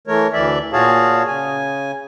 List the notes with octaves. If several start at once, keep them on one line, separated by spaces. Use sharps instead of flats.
E3 A3 A#4 C#5
D2 E3 D5 E5
A#2 F#4 G#4 C#5 F5 A5
C#3 G#5